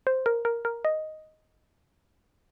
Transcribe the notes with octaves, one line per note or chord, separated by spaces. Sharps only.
C5
A#4
A#4
A#4
D#5